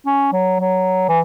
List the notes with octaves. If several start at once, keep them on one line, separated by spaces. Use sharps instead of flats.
C#4
F#3
F#3
E3